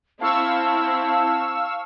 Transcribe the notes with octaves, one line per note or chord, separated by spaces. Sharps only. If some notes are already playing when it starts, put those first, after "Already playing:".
C4 E4 F5 A5 C#6 E6